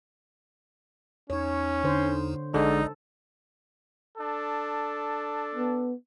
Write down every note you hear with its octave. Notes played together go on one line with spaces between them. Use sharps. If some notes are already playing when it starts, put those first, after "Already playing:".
E2 C#4 D#4 C#5
D3 C5
A#1 D3 G#3 D#4 A4 D5
D4 A4
B3